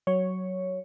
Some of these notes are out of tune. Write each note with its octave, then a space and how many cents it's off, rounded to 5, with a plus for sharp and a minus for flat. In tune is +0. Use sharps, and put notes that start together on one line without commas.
F#3 +10 C#5 +0